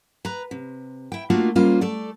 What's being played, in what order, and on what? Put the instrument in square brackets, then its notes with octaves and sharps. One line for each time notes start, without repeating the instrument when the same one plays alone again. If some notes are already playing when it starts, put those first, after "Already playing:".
[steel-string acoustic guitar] B4 A#5
C3
E4 G5
A3 A#3 D4 D#4 F4 F#4
G3 A#3 C#4 F4 C5
A3 A4 D5